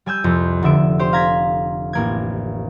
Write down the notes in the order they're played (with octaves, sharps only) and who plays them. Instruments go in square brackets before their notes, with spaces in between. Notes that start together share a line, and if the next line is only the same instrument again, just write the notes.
[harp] G3 G#5 E6 G6
C2 F2
F1 D3 E5 D7
G4 C5 C6
F5 A#5 G#6 B6
A1 A#3 G#6